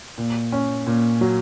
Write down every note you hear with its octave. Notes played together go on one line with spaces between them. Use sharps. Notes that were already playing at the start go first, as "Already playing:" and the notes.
A#2
C#4
A#2
F#3